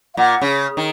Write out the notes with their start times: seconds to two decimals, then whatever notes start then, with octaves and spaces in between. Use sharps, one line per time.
0.13 F5
0.17 A#2 F#5
0.41 C#3
0.77 D#3